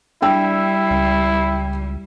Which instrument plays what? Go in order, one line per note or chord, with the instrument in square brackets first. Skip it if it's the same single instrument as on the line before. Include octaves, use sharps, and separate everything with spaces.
[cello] G3 [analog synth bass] D4 [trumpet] E4 [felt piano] G5 E6
[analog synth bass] C#2